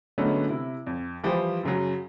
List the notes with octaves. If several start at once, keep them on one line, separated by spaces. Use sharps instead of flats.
D3 F#3 G#3 A3 B3 C#4
C3 E4
F2
E3 F3 G3 G4 C5
F#2 C#3 F#3